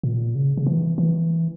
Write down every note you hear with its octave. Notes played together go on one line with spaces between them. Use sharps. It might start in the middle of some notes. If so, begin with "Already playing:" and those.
A#2
C#3
C#3
E3
E3